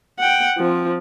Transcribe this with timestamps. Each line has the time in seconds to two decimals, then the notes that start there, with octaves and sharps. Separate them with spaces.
0.20 F#5 G5
0.58 F3 C4